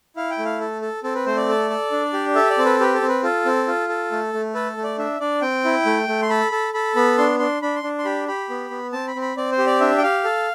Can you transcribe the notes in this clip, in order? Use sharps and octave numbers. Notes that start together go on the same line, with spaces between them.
E4 F5
G5
A3
F5
A4
A4
C4 A4
B4
A3 C5
D5
A4
A4
D4
G4
A4 E5
D5
C4
B4
G4 B4
A4
C4
B4
F4 A4
C4
F4
A4
A3
A3
A4 B4
A3
D5
D4 E5
D4 D5
C4 G5
E4
A3
A3
C6
A4 B5
A4
A4 B5
B3 B5
D4 C6
D4 C6
D4 B5
C6
D4
C6
G4 B5
G4 B5
B3
B3
C4 A5
B5
C4
B5
C4 D5
C5
G4
D5
D4 E5
G5
G4 F5
A4